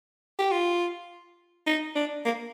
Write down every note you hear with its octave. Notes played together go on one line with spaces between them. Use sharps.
G4
F4
D#4
D4
A#3